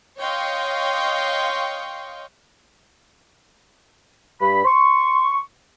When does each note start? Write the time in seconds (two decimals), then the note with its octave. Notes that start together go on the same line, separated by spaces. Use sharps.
0.18 C#5 D#5 F5 G5 C6 C#6
4.40 G2 B5
4.64 C6 C#6